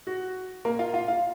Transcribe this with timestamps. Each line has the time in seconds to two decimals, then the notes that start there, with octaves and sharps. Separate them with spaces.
0.07 F#4
0.65 A#3 A#4
0.79 F4 F5
0.94 F4 F5
1.08 F4 F5